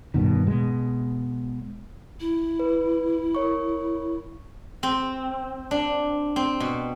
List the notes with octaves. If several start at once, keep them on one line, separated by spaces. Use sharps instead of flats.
G2 B2 D#3
B2 G#3
E4
B4
A#4 C#5 C#6
C4
D4
C4
B2